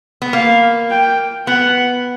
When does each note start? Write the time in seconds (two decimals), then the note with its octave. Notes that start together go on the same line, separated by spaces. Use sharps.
0.22 B3
0.33 A#3 F5
0.90 G5
1.47 B3 F#5